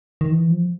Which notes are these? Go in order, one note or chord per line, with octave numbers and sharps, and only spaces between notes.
D#3
E3
F3